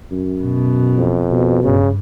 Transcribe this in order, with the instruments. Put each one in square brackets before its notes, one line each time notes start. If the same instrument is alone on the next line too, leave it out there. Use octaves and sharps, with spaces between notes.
[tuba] F#2
[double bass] B2
[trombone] F2
[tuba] B2
[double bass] G2 [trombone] C#3